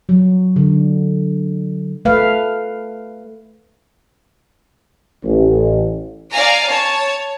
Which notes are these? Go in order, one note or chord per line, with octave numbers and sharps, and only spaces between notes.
F#3
D3
A3 B4 F5
A1
D5 F5 G#5 A#5
C#5 A5